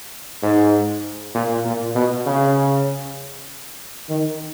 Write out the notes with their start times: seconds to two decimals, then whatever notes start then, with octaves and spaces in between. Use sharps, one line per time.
0.43 G#2
1.34 A#2
1.65 A#2
1.95 B2
2.26 C#3
4.09 D#3